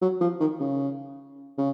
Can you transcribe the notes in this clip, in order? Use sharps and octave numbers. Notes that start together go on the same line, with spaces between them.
F#3
F3
D#3
C#3
C#3